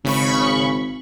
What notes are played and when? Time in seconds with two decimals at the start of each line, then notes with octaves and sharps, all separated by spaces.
0.05 G#1 C#3 B5 C#6